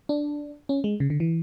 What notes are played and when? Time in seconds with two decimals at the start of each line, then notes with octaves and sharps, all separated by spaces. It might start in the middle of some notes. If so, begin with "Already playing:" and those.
0.09 D4
0.69 C#4
0.84 G#3
1.00 C#3
1.10 D3
1.20 E3